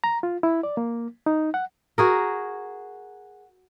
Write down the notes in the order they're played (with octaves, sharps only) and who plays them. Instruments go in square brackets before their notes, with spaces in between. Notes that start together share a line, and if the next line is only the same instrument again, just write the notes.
[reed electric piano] A#5
F4
E4
D5
A#3
D#4
F#5
[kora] F#4 G#4 A#4